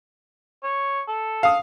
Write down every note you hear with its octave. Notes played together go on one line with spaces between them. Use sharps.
C#5
A4
F5 D#6